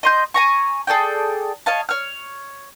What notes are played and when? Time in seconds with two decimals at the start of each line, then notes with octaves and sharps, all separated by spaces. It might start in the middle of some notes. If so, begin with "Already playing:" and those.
0.03 D#5 C6 G6
0.34 G#5 A#5 C#6
0.87 G#4 A4 D5 G5
1.66 C#5 D#5 F5 A5
1.89 C#5 F6